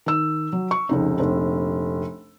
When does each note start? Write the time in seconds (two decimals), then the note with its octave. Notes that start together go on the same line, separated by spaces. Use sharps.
0.06 D#3 E6
0.53 F#3
0.71 C#6
0.89 F1 C#2 D#4
1.19 F1 A#1